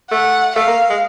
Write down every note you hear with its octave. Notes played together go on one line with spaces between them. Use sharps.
A3 F#5
A3 F5
A#3
G#3